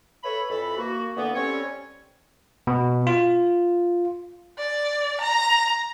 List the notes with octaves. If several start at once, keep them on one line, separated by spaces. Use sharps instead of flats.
A4 B4 C#5 E5 B5
F2 E3 A4 B5
A#3 F#4
D3 E3 A#3 B3
G3 C4 C#4 A4 C#5
B2
F4
D5
A#5